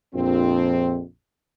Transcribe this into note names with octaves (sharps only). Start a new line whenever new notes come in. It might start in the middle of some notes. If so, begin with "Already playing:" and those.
A#1 F2 C4